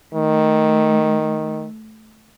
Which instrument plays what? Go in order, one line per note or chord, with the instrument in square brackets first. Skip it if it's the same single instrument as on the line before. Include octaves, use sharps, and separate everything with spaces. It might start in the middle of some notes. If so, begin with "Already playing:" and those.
[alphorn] D#3 [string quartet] A3